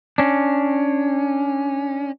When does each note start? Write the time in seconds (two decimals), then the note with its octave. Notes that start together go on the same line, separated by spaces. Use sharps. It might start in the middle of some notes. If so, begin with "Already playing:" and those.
0.18 C#4 D4